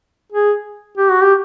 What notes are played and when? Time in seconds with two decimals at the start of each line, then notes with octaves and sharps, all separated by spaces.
0.32 G#4
0.97 G4
1.10 F#4
1.22 G4